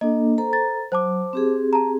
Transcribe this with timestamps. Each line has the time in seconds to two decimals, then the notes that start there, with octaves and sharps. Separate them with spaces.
0.01 A#3 D4 A4 D#5
0.38 A4 C5 A#5
0.53 A6
0.92 F#3 C5 A5 D6
1.33 C4 G4 G#4
1.73 A5 A#5